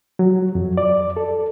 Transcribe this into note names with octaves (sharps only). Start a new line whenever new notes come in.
F#3
F2
D5
A4